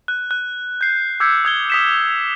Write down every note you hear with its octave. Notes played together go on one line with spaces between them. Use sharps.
F#6
F#6
G6 C7
D6 E6 G6 G#6 B6 C#7
D#6 G#6 G7
D#6 B6 E7